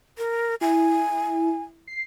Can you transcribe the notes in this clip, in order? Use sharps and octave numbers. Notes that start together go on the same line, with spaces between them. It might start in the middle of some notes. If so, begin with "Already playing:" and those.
A#4
E4 G#5
C7